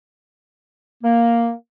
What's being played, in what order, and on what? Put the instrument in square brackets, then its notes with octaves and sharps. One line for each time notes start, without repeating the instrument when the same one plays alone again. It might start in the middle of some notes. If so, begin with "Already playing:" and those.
[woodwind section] A#3